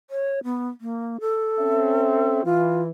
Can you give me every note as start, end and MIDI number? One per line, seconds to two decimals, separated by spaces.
0.10 0.39 73
0.44 0.68 59
0.81 1.17 58
1.21 2.42 69
1.60 2.44 60
1.60 2.44 61
1.60 2.44 76
2.45 2.91 52
2.45 2.82 65